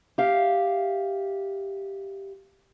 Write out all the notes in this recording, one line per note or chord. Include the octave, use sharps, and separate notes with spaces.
G4 E5 F5